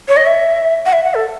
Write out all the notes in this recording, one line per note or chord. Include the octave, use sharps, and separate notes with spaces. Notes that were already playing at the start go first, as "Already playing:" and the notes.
C#5
D#5
E5
F#5
E5
F#5
A4